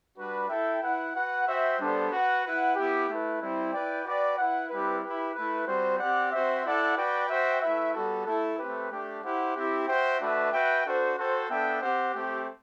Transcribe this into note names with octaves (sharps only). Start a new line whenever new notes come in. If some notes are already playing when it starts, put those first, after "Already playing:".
G3 D4 F#4 B4
E4 A4 E5 G5
E4 B4 F#5
F#4 B4 F#5
F#4 C5 E5 G5
G3 B3 D4 A4 C5
F#4 B4 F#5
E4 B4 F#5
B3 E4 G4
A3 E4 B4
G3 C4 E4
E4 B4 D5 G5
F#4 B4 D5 G5
E4 B4 F#5
G3 C4 E4 G4 B4
E4 G4 B4
A3 E4 B4
G3 C4 F#4 C5
C4 G4 D5 F#5
C4 F#4 C5 E5
E4 A4 D5 F#5
F#4 B4 D5 G5
F#4 C5 E5 G5
A3 E4 B4 E5
G3 B3 F#4 A4
A3 E4 A4
A3 C4 G4 B4
A3 D4 G4
E4 G4 C5 F#5
C4 E4 G4
F#4 C5 E5 G5
A3 D4 F#4 B4 E5
F#4 B4 E5 G5
D4 F#4 A4 C5
F#4 A4 C5 G5
B3 D4 A4 E5 G5
C4 G4 C5 F#5
A3 C4 G4